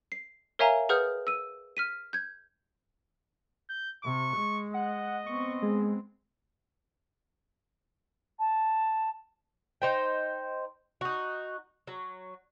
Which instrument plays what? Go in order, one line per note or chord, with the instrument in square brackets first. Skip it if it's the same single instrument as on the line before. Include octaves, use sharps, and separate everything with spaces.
[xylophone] C7
A#4 C#5 E5 F5 G#5 A#5
G#4 B4 F#5 D#6 F6 G6
E6 D#7
F6 B6 D#7
G6 G#6
[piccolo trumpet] G6
[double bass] C3 [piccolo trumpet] C#6
[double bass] G#3
[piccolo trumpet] D#5 [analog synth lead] F#5
[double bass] B3 C4 [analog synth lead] C#6
[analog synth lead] G#3
[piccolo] A5
[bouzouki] D#4 C5 G5
D#4 F#4
F#3